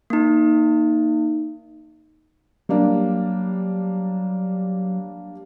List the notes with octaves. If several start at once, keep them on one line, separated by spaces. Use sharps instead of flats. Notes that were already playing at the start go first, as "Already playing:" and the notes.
A#3 D#4
F#3 G3 A#3 D4